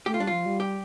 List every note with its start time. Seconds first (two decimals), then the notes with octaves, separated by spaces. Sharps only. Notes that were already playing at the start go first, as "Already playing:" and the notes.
0.06 A3 G4
0.14 F4
0.20 G3 D4
0.27 F3 F4
0.46 G3
0.60 G4